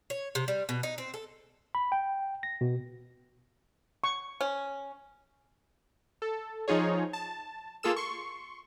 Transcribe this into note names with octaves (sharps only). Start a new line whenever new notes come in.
C#5
C3
G3
B2
D#4
C4
A4
B5
G5
A#6
B2
C#6
C#4
A4
F3 D#4 F4 G#4 C#5
A5
A#3 F4 G#4 A4 E6 E7
C6 C#6